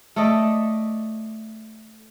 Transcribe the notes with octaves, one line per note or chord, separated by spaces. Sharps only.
A3 A4 D5 D#5